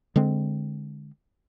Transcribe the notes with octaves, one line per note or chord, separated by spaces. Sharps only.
D3 G#3 C4